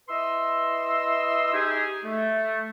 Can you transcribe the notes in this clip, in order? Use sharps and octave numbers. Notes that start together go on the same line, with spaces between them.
E4 B4 D#5 C6 E6
D#4 G4 G#4
A3